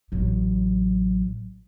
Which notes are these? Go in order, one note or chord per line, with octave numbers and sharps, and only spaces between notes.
A1 F#3